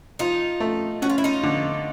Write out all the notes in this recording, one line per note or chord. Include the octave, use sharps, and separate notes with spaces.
F3 D#4 F4
A3
C#4 F#4
F4
E4
D#4 F4
D3